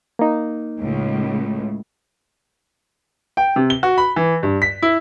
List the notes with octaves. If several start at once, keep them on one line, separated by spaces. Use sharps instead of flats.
A#3 D#4
C#2 A2
G5
C3
G7
F#4
B5
E3
G2
B6
E4